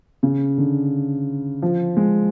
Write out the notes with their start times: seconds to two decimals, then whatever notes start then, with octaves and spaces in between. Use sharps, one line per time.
0.23 C#3
0.58 D3
1.62 F3
1.97 G#3